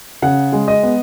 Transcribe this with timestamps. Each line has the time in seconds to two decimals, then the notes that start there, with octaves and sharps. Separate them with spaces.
0.22 C#3 F#5
0.52 G#3
0.68 D#5
0.83 B3